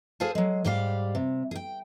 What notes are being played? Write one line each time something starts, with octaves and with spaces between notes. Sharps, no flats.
G#4 A4 C5 F5 G#5 A5
F#3 G#3
G#2 G3 G4 D5 F5
C3
G#4 G5